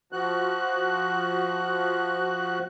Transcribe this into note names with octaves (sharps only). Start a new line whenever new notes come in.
F3 F#4 F#6